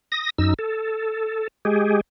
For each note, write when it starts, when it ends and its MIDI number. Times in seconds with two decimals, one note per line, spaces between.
0.12 0.30 87
0.12 0.30 94
0.38 0.54 42
0.38 0.54 63
0.38 0.54 88
0.59 1.48 69
1.65 2.01 56
1.65 2.01 67
1.65 2.01 68